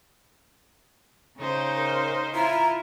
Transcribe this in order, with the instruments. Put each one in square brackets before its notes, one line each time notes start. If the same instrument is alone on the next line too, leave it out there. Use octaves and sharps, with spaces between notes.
[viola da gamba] C#3 D#4 C5
[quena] A#4
[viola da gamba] E4 F4 [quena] A#5